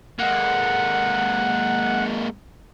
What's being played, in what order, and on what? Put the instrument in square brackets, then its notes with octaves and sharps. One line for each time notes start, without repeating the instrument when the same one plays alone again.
[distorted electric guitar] G#3 A#3 [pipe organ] F#5